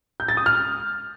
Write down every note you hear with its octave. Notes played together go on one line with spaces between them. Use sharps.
G6
A6
D#6
F6